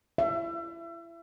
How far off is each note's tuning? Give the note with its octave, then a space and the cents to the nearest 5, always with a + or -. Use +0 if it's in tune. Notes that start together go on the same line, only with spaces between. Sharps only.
E5 +30